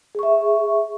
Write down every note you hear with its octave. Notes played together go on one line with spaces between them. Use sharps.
G#4 E5 C#6